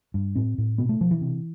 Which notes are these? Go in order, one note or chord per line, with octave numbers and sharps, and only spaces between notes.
G2
A2 C4
A2
B2 B3
A3
B2 F3
E3
C3